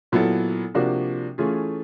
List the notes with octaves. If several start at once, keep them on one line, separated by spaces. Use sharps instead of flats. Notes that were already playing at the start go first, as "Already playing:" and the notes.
A#2 F#3 B3 E4 A4
C3 F3 A#3 D4 F#4
E3 A3 C#4 F4 G#4